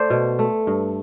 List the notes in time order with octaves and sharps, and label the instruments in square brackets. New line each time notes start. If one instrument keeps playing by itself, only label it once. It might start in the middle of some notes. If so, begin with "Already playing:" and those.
Already playing: [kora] A3 C5 D5
B2
A3
G2